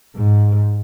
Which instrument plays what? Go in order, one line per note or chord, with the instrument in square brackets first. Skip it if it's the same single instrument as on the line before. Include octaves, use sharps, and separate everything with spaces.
[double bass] G#2